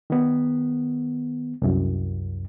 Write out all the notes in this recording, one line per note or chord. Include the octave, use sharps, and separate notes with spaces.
D#3 B3
C2 F#2